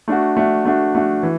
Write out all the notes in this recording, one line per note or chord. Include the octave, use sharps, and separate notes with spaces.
A3 D4 F#4
A3 D4 F#4
A3 D4 F#4
A3 D4 F#4
E3